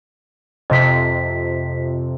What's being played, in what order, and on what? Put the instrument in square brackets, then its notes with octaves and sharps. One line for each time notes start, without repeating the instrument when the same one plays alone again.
[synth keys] F2 C3 [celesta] D#5 B6